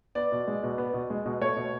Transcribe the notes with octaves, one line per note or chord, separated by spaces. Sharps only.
B3 D5
B2
G#3
B2
B3
B2
G#3
B2
A3 C#5
B2